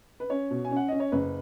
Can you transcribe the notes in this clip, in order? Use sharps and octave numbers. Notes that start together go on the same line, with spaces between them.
B4
C#4 C#5
B2
G#5
C#4
F#5
C#4 D#5
C#5
F#1 B4